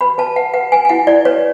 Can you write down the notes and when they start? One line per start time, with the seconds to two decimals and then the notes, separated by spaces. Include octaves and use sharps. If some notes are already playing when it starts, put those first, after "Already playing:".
0.01 B4 B5
0.18 B4 A5
0.36 B4 F#5
0.54 B4 F#5
0.72 B4 G#5
0.85 G#5
0.89 E4 F#5
1.07 E4 D5
1.25 B4 C#5